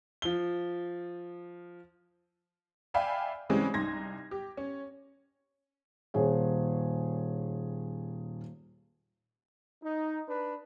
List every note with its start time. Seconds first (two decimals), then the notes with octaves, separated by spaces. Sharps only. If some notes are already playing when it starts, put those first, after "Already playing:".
0.22 F3 G7
2.94 D5 E5 F5 G5 G#5 B5
3.49 C#3 E3 G3 G#3 C4 C#4
3.74 C2 D#4 C6 G#6 A#6
4.31 G4
4.57 C#4
6.14 D#1 G#4 C#5
9.83 D#4
10.28 D4 B4